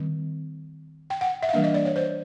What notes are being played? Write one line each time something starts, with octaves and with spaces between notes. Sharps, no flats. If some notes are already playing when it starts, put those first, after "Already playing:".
Already playing: D#3 G3 C4
G5
F#5
E5
F5
E3 G3 A#3 D4 E5
D#5
D5
C#5
C5